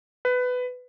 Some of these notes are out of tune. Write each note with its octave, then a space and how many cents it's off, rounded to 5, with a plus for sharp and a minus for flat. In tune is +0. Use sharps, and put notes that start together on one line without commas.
B4 +15